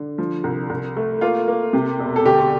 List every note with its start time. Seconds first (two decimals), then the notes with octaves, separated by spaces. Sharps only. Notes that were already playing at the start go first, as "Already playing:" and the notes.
Already playing: D3
0.18 F3
0.44 C2
0.70 C2
0.96 A3
1.21 A#3 F4
1.47 A#3
1.73 C3
1.99 E1
2.16 A4
2.25 D2 G4